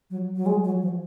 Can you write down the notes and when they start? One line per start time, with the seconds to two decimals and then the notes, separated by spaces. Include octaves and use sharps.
0.10 F#3
0.36 F#3
0.46 G#3
0.64 F#3
0.82 F3